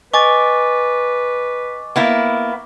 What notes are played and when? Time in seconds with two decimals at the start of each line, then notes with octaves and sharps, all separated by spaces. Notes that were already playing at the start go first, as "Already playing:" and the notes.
0.14 B4 D#5 G#5 C#6 D6 A6
1.96 A#3 B3 E4